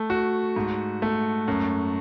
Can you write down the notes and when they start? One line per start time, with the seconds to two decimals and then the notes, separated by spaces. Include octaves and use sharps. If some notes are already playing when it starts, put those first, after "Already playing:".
Already playing: A3
0.10 F#4
0.56 G#2
1.02 A3
1.48 F#2